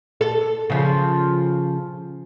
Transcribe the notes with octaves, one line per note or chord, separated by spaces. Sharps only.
A4
C#3 F3